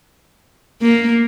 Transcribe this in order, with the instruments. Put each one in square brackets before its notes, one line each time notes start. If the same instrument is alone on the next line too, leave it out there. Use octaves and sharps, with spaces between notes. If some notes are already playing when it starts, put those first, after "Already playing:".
[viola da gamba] A#3